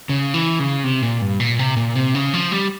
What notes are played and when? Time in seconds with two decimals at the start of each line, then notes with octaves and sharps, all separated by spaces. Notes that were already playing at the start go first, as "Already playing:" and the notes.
0.09 C#3
0.34 E3
0.59 C#3
0.84 C3
1.03 A#2
1.21 G2
1.40 A#2
1.59 C3
1.77 A#2
1.95 C3
2.15 C#3
2.34 F3
2.52 G3